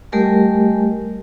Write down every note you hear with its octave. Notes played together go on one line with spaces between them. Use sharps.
G3 A3 G4 A#4 D#5 G#5